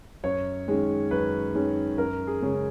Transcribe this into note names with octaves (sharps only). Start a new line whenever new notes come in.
F#2 C#5
D#3 G#3 C#4
F#2 B4
D#3 G#3 C#4
F#2 A#4
G#4
C#3 G#3 C#4